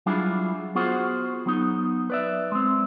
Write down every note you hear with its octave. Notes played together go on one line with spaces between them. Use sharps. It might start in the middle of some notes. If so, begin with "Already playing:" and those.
F#3 G3 D4 E4 F4 G#4
B3 F4 F#4 G#4 C5
F#3 B3 D#4
B4 D5 E5
G#3 C4